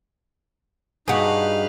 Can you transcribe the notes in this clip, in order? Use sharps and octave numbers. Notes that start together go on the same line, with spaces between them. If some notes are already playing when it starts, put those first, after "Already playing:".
G2 D#4 F#4 G#4 B4 F5